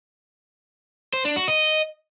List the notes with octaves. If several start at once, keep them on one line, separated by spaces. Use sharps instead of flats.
C5
D4
F#4
D#5